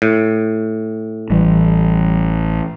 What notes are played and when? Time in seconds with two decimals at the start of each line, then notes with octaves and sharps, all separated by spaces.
0.02 A2
1.30 A1 E3 G3